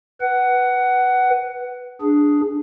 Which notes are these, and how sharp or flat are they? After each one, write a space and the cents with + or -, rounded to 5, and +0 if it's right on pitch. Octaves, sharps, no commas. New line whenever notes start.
B4 +0 F#5 +20
D4 +0 G#4 +0